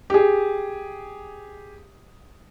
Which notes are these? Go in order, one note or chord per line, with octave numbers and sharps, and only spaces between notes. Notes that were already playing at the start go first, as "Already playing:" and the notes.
G4 G#4